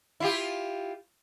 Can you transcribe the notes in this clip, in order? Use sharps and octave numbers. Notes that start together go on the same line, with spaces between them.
E4 F4 G4